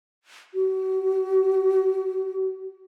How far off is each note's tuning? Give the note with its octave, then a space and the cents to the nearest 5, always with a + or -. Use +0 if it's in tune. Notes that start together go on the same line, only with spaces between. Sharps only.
F#4 +35